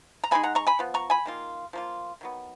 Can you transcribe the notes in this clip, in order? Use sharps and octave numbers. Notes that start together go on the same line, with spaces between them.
A#5
B2 G#3 D#4 G#5 B5
F#5 A#5
A#5 C#6
G#5 B5
F3 B3
A#5 C#6
G#5 B5
D#3 A#3 F4
F3 A#3 F4
D#3 F#3 B3